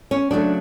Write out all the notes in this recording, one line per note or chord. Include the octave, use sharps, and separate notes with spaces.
C#4
C#3 F#3 A3 D4